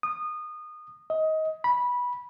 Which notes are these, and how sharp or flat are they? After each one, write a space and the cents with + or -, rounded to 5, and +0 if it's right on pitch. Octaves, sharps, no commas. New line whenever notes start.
D#6 -25
D#5 +20
B5 -15